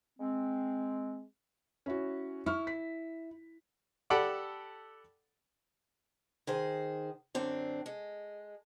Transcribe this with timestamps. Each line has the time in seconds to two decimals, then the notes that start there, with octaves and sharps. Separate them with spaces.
0.20 G#3 C4
1.86 C#4 E4 F#4
2.46 E4 C#6 F6
2.67 B6
4.10 G4 A4 D5 F#5 B5 D6
6.47 D#3 G#4 C5
7.35 F#2 D3 C4 D4
7.86 G#3